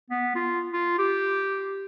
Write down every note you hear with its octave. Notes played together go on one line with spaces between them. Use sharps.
B3
F4
F4
G4